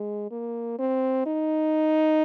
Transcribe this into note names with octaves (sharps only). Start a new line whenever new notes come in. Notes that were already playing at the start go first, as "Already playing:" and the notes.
Already playing: G#3
A#3
C4
D#4